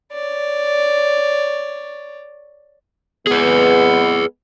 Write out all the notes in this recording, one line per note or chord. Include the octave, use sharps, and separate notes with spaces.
C#5 D5
G#3 B3 G#4 B4